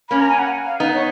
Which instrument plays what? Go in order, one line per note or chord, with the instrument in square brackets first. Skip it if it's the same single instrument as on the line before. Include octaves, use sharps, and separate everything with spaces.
[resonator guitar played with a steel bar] A#3 C#4 [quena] B5
[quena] A#5
G#5
F#5
F5
[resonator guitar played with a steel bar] B3 D#4
[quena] C#5